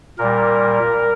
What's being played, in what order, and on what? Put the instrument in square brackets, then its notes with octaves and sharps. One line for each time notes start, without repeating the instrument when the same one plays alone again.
[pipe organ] A#2 G3 A#4